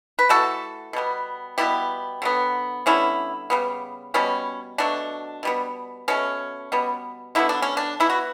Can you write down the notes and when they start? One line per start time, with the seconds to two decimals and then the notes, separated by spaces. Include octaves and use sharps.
0.19 B4
0.29 E3 A3 F#4 A4
0.93 B2 G3 B3
1.58 B2 G3 B3 E4 G4
2.22 D3 F#3 B3
2.86 D3 G3 B3 C#4 E4
3.50 C#3 G3 B3
4.14 B2 G3 B3 C#4
4.78 B2 F#3 A3 D4
5.43 B2 G3 B3
6.08 B2 A3 C#4
6.72 B2 G3 B3
7.35 D3 F#3 B3 E4
7.49 D4
7.62 C#4
7.77 D4
8.00 E3 B3 E4
8.10 F#4